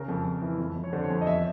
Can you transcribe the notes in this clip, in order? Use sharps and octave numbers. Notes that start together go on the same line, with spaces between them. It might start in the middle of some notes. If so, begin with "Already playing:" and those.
Already playing: C#3 A#4
F2
F2
E3
F2
F2
C#5
D3 C5
C#5
F2
D#5
E2 E5